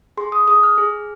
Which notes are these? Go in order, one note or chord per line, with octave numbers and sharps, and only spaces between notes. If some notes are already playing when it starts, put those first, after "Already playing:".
G#4 C6
D#6
G#4 D#6
F6
G#4